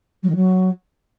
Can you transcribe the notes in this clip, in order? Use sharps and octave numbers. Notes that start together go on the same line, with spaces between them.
F#3
D#3
F#3